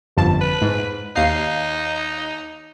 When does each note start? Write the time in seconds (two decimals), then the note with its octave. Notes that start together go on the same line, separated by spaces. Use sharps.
0.17 G1 F2 A5
0.41 B4
0.61 G#2
1.16 D#2 D#4 F5 C7